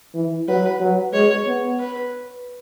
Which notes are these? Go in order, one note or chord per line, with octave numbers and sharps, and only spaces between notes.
E3
F#3 B4
F#3
G#3 C#5
B3
B4